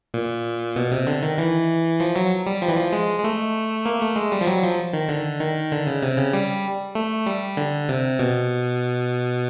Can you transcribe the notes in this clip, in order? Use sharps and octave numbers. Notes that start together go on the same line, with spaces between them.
A#2
B2
C3
D3
D#3
E3
F3
F#3
G3
F3
E3
F3
G#3
G#3
A3
A#3
A3
G#3
G3
F3
F#3
F3
D#3
D3
D#3
D3
C#3
C3
C#3
G3
A3
G3
D3
C3
B2